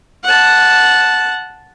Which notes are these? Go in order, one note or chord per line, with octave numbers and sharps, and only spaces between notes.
F#5 A5